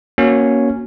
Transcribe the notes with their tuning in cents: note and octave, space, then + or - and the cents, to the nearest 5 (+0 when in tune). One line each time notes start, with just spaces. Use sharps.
A#3 +20 C#4 +0 F#4 +0